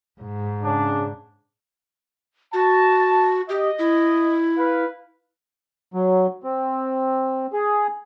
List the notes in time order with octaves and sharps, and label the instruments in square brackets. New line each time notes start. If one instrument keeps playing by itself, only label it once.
[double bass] G#2
[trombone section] C#3 D4
[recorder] F#4 [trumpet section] A5
[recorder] G4 [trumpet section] D#5
[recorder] E4
[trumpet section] B4 F5
[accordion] F#3
C4
G#4